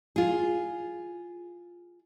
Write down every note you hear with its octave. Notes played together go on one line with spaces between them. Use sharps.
F4 G#4